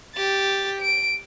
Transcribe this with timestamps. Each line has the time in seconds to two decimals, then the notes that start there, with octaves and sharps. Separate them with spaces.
0.16 G4 A6
0.80 D7